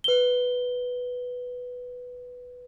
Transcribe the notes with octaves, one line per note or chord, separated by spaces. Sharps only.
B4 G7